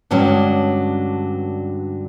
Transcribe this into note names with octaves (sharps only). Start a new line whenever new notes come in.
G2 D3 F#3 G#3 C#4